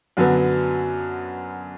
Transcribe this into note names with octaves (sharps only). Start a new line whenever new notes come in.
F#2 D3 F#3 B3